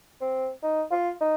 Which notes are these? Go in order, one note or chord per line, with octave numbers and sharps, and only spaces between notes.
C4
D#4
F4
D#4